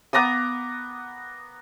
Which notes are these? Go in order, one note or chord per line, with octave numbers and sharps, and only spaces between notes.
B3 A#5 D6 D#6